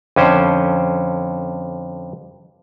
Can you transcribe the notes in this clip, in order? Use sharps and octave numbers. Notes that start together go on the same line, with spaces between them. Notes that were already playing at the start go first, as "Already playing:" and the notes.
F2 D3 C#4 C5